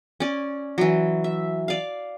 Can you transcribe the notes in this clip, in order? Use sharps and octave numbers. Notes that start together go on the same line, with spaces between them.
C#4 D5
E3 F#3
E5
D5 F5